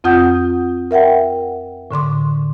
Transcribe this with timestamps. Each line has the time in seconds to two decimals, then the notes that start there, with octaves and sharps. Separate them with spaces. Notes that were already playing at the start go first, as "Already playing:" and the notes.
0.04 F2 C4 F4 F#5 D#6 G6
0.91 A#4 E5 F#5 G5
1.91 A2 D3 C6 D6